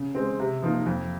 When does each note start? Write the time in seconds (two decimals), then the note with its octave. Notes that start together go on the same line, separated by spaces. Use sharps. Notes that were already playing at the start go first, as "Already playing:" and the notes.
Already playing: C#3
0.15 G#3 C4
0.40 C3
0.63 F3 A#3 D#4
0.86 F2